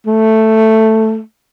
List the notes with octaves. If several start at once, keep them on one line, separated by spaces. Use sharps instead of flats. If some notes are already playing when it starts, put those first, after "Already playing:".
A3